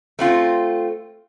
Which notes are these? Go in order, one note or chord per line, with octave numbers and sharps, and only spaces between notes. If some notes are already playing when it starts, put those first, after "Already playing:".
A3 C4 F4